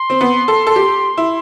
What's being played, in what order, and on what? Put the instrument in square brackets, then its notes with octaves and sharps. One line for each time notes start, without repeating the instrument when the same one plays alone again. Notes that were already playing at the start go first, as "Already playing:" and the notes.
Already playing: [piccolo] C6
[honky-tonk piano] C4
B3
A4
A4
G4
E4